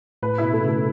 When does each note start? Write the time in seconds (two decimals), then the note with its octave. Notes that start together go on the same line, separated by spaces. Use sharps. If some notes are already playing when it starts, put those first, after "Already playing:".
0.23 A2 B4
0.38 E4
0.43 B2
0.53 A3
0.64 C#3 A3